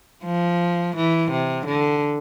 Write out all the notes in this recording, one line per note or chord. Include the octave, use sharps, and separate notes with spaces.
F3
E3
C3
D3